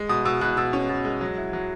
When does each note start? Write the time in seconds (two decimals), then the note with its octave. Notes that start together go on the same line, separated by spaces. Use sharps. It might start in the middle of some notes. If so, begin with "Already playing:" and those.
Already playing: G#3
0.09 B2 D#6
0.25 B2 E6
0.41 B2 F#6
0.57 B2 E6
0.73 C#4
0.89 B2
1.05 G#3
1.21 F#3
1.37 E4
1.53 F#3